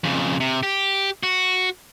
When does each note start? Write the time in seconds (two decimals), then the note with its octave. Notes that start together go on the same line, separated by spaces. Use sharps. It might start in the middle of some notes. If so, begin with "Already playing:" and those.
0.04 F2 C#3
0.40 C3
0.63 G4
1.23 F#4